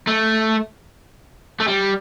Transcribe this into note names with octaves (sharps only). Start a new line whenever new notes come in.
A3
A3
G3